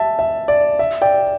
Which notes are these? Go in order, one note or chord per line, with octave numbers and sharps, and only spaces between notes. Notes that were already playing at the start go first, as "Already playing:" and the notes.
Already playing: E5 A5
E5
D5
E5
D5 G5